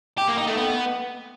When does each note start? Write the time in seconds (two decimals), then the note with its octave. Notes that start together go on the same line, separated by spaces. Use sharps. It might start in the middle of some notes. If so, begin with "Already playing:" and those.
0.18 G4
0.28 A#3
0.38 D#4
0.48 A3
0.57 B3